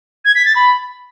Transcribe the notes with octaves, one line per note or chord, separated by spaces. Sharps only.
G#6
B6
A6
B5